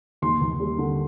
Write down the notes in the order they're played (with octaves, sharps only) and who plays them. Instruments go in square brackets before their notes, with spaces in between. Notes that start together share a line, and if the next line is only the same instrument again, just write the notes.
[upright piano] D#2 C6
D#2
G3
D3